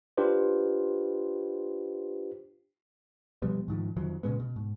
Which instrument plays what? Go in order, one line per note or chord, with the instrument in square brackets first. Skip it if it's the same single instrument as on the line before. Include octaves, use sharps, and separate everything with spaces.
[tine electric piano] D4 F4 G4 B4 C5
[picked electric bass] B2 F3 G3 B3
G#2 D#3 F3
F2 D#3 F3 F#3
A#2 C#3 G#3 B3
B2
G#2